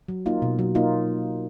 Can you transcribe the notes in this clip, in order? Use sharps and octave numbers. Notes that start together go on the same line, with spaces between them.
F#3
A#3 D#4 F4
B2
F#3
A#3 D#4 F4